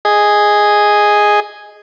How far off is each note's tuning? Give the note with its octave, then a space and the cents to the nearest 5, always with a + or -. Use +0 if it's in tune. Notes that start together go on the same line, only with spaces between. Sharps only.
G#4 +0 D#5 +0